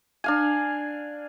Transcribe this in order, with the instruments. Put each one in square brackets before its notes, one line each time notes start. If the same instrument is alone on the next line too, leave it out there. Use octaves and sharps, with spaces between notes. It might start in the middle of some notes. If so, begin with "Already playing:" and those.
[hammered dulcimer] D4 F5 G#5